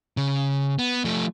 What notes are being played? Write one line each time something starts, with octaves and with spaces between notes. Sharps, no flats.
C#3
B3
F3 A3